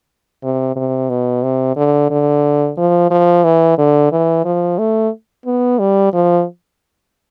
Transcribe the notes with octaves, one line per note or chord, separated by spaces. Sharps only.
C3
C3
B2
C3
D3
D3
F3
F3
E3
D3
E3
F3
A3
B3
G3
F3